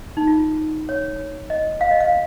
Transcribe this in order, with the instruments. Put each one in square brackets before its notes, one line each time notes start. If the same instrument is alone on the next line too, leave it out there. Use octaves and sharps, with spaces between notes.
[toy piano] D#4
F4
C#5
D#5
F5
D#5
F5